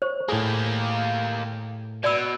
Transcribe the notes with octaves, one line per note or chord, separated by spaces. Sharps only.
C5 C#5
A2 A#3 G4 G#4
B2 D5 B5 E6